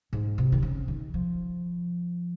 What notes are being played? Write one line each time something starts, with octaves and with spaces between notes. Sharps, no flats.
G#2
C3
D#3
C#3
D#3
F3